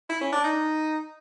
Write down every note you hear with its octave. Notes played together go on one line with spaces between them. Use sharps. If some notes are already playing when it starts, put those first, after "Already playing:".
E4
C#4
D4
D#4